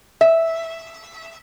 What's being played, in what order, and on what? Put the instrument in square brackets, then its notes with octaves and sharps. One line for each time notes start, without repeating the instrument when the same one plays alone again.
[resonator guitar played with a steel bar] E5